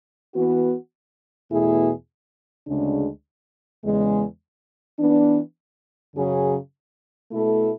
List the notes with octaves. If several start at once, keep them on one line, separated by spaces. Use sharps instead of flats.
E3 B3 F#4
E2 B2 A3 E4 G#4
D2 C#3 G#3 D4
E2 C#3 G#3
E3 B3 D4
F#2 C#3 F#3 C#4 G#4
B2 A3 E4 A4